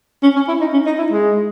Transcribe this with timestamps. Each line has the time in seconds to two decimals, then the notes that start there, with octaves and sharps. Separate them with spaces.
0.23 C#4
0.36 C#4
0.48 E4
0.61 D#4
0.73 C#4
0.86 D#4
0.98 E4
1.11 G#3